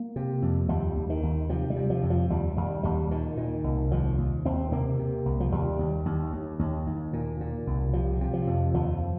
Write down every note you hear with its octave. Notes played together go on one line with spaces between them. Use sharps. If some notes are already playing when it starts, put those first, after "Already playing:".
Already playing: A#3
C3
F2
D#2 G3
D#2
D#3
D#2
C3 F3
G3
C3
F3
F2
F3
D#2 G3
D#2 G3
D#2 G3
A#2 D#3
A#2
C2
D#2 F3
D#2
D#2 C4
C3 A#3
C3
C2
F3
D#2 G3
D#2
D#2
D#2
D#2
D#2
A#2
A#2
C2
C3 F3
C3
F3
F2
D#2 F3